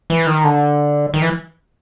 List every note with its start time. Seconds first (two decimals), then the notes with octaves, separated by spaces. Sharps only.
0.10 E3
0.27 D#3
0.44 D3
1.14 D#3
1.22 E3